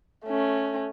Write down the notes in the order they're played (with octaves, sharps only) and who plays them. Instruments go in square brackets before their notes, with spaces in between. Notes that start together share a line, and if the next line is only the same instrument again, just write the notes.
[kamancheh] A3 C#4